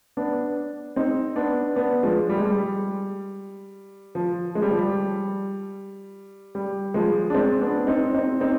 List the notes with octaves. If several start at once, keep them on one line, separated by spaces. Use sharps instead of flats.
B3 D4
C4 D#4
B3 D4
B3 D4
F3 G#3
G3
G#3
G3
F3
G#3
G3
F3
G3
G3
F3 G#3
D4
G#3 C4
B3 D4
C4 D#4
C4 D#4
C4 D#4